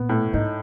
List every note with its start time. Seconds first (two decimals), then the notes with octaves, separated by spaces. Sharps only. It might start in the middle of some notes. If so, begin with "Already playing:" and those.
Already playing: A#2 B3
0.09 A2
0.33 G#2 D#4